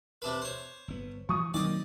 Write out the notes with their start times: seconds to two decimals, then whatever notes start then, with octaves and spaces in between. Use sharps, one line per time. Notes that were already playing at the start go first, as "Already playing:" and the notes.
0.22 C3 D4 B4
0.42 C5 C#5
0.88 G1 B3
1.29 E3 C#6 D#6
1.54 D#3 F#3 A#3 C4 D5 D#5